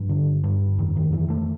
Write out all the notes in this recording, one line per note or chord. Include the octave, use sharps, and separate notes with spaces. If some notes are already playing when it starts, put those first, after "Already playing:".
Already playing: G2 F3
D3
G2
F2 D#3
D#3
F2 E3
A3